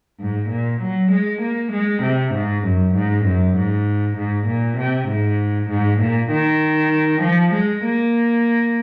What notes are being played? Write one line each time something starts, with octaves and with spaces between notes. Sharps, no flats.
G#2
A#2
F#3
G#3
A#3
G#3
C3
G#2
F#2
G#2
F#2
G#2
G#2
A#2
C3
G#2
G#2
A#2
D#3
F3
G#3
A#3